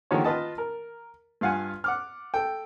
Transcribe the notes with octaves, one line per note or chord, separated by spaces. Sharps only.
D3 D#3 F3 A#3 G4 C#5
F4 B4 D#5 A5
A#4
G2 F4 F5 F#5 G#5
F#5 D6 F6
A4 G5